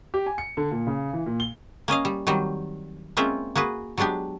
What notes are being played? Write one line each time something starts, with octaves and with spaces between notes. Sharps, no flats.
G4
G#5
C#7
D3
A#2
C#3
E3
A#2
G7
A#3 C#4 D#5 F5
G3
D#3 F#3 G3 C4
G#3 A#3 C4 C#4 F4 E5
A#3 F#4 G#4 B4
F#3 G#3 B3 D4 G4